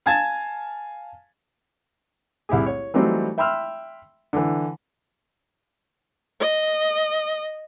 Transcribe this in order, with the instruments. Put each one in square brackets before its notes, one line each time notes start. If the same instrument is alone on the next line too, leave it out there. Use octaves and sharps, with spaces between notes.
[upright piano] F5 G#5 A5 G#6 A6 E7
[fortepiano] C2 E4 G4 G#4
C#5
E3 F#3 G3 A3 C4 D#4
E5 G5 B5 C6 E6 F6
D3 E3
[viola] D#5